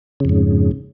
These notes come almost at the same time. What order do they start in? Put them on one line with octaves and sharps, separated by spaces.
C#3 F2 G#2